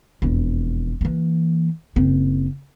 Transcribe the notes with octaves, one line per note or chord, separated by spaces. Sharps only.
E1 F2
E3 A#3
F#1 C4